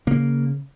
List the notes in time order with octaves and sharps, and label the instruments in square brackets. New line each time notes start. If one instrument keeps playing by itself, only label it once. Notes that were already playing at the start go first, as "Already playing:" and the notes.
[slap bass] C#3 A#3